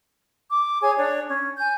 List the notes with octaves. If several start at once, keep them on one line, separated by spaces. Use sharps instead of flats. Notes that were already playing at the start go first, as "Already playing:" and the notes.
D6
G#4 C#5 G#5
D4 C#5
C#4
G#5 G6